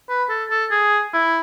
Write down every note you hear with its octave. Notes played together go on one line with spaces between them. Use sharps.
B4
A4
A4
G#4
E4